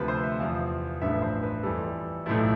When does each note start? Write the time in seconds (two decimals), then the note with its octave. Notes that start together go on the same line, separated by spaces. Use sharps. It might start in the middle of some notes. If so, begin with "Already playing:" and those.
Already playing: D2 C3 F3 A4 B4
0.08 C5
0.24 E5
0.39 E2 C3 F3 F5
1.02 A1 G2 F3 A3 E5
1.22 C5
1.43 B4
1.63 F2 E3 G3 A4
2.26 B1 A2 F3 A3 E4